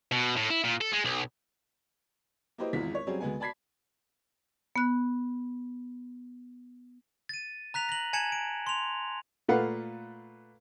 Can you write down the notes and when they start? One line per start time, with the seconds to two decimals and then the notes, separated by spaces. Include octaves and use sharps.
0.12 B2
0.36 A2
0.50 E4
0.64 A#2
0.81 A4
0.93 G#3
1.05 B1
2.58 A#3 E4 G4 B4 C5 D#5
2.73 G#1 E2 G#2 E4 F4 B6
2.95 C#5
3.07 F#3 G3 C4 C#4 G#4
3.20 D2 G#3 B3 G#5
3.40 D5 A5 B5 G#6 B6 C7
4.76 B3 F#6
7.29 A6 D#7
7.74 A#5 F#6 B6 F7
7.89 A#6 F#7
8.13 G#5 A5 G#6 C#7 E7 F#7
8.32 D7
8.67 C6 F7
9.48 A#2 A3 B4 F5 F#5